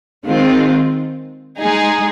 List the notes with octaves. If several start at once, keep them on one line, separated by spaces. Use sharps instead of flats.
D#3 G#3 C4 F4
G#3 D#4 G#4